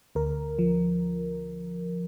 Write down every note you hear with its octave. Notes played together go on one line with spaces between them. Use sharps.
D2 A#4
F3